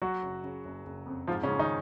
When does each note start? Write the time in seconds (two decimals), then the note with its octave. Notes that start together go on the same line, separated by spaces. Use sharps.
0.02 F#3 F#4
0.23 F#1
0.44 C#3
0.65 F#1
0.86 F#1
1.06 F2
1.28 G#2 F3 F4
1.43 C#3 C#4
1.48 G#2
1.59 D#3 D#4